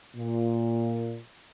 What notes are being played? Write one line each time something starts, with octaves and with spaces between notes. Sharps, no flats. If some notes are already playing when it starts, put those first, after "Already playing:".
A#2